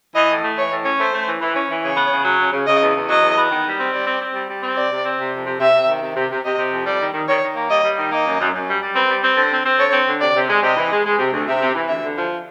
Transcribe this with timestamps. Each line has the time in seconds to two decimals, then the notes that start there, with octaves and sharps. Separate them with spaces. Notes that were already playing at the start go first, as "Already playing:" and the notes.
0.15 E3 D#5
0.30 A2
0.44 A3
0.57 E3 C#5
0.71 A2
0.85 C#4
0.99 A3 C5
1.13 A3
1.28 E3
1.41 E3
1.56 C#4
1.69 E3
1.83 C#3 C#5
1.97 B3
2.12 C#3
2.25 F#3
2.40 C#3
2.53 C#3
2.67 C#3 D#5
2.81 E2
2.95 E2
3.10 F#3 D#5
3.22 E2
3.37 B3
3.51 D#3
3.65 G3
3.79 C4
3.93 G3 D5
4.07 C4
4.21 C4
4.35 G3
4.48 G3
4.63 C4
4.76 C3 D5
4.91 C3
5.05 C4
5.18 C3
5.33 F2
5.46 C3
5.60 C3 E5
5.74 C3
5.88 D#3
6.02 C3
6.16 C3
6.30 C3
6.44 C3 D#5
6.58 C3
6.72 F2
6.86 G3 D5
7.01 D#3
7.14 D#3
7.28 D#3 C#5
7.42 D#3
7.56 A#3
7.70 G3 D#5
7.84 G3
7.97 D#3
8.11 A#3 D#5
8.26 F#2
8.39 F#2
8.53 F#2
8.68 G3
8.82 G3
8.96 C4 B4
9.10 G3
9.24 C4
9.37 D3 C5
9.52 C4
9.66 C4
9.79 D3 C#5
9.93 C4
10.07 D3
10.21 C3 D5
10.35 C3
10.50 G#3
10.63 C3 D#5
10.77 E3
10.92 G#3
11.05 G#3
11.19 C3
11.32 D2
11.47 C3 E5
11.61 C3
11.75 E3
11.88 D2 E5
12.03 D3
12.17 F3